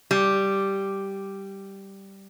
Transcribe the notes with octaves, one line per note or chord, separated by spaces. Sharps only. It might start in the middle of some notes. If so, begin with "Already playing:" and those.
G3